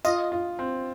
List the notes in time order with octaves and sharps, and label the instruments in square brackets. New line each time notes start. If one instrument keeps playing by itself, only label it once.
[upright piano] F4 [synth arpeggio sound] D#5
[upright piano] F4
C4